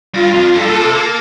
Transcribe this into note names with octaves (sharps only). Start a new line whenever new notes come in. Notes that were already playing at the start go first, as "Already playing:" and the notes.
G2 F4
F2
G2 A4
A#2
C3
A#3